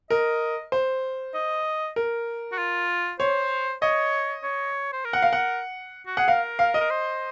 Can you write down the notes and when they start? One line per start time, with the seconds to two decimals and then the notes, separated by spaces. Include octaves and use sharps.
0.10 A#4 D#5
0.72 C5
1.35 D#5
1.96 A#4
2.52 F#4
2.58 F4
3.20 C5 C#5
3.82 C#5 D#5
4.43 C#5
4.93 C5
5.05 A#4
5.13 F#5
5.22 F5
5.33 F#5
6.07 F#4
6.17 G#4 F#5
6.28 A#4 F5
6.59 F5
6.74 D#5
6.81 A#4
6.90 C5